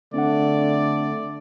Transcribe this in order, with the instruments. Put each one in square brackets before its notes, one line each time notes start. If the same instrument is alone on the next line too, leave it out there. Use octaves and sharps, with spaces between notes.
[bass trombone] D3 [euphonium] A3 [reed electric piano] C4 D4 F#5 [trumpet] D5